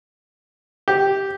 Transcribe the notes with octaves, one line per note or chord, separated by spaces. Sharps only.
G4